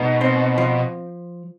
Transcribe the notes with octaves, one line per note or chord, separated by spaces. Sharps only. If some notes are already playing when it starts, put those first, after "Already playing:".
Already playing: G#2 B2 D#4
C4
F3